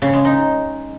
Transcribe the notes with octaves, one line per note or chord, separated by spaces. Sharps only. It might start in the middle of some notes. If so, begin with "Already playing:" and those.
C#3
G#3
D#4